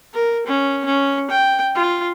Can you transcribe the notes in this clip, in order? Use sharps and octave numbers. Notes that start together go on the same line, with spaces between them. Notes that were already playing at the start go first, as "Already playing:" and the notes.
A#4
C#4
C#4
G5
F4